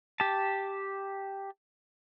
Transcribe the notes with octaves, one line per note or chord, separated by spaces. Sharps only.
G4 A5